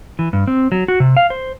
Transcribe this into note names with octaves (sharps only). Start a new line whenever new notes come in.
E3
G2
C4
F#3
F#4
C3
F5
C5